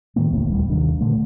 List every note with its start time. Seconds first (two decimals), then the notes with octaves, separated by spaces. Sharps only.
0.16 A2 D#3 G#3 A#3
0.31 E1 C#2 A2 D3
0.50 D#1 A1 G3
0.70 D#2 C3 D#3 D4
1.01 A#2 D3 A3